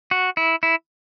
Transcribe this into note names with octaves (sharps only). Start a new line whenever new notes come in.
F#4
E4
E4